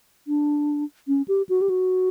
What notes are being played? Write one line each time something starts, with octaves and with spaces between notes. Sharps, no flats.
D4
C#4
G4
F#4
G4
F#4